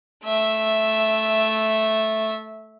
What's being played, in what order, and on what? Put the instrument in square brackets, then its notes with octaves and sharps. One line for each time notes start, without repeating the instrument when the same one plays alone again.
[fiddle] A3 E5